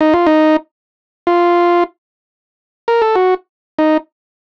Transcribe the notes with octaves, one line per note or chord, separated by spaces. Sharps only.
D#4
F4
D#4
F4
A#4
A4
F#4
D#4